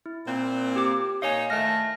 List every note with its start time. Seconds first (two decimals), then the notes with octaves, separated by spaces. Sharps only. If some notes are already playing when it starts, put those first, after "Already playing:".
0.06 E4
0.26 A#2 C4
0.76 G4 D6
1.22 A#2 D#4 C#5 F5 G#5
1.50 A2 D#3 A3 F6 A#6